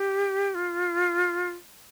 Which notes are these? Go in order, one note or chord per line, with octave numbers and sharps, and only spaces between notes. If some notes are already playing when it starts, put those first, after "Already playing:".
Already playing: G4
F4